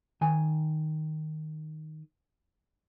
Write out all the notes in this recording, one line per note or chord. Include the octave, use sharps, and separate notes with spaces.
D#3 G#5